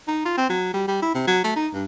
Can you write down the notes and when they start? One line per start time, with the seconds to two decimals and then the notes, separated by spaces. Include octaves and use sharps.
0.08 D#4
0.25 F4
0.37 C4
0.50 F#3
0.74 G3
0.88 G3
1.02 E4
1.15 C3
1.27 F#3
1.44 A3
1.56 D#4
1.74 G2